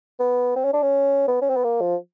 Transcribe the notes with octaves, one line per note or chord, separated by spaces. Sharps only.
B3
C4
C#4
D4
C#4
B3
C#4
C4
B3
A#3
F3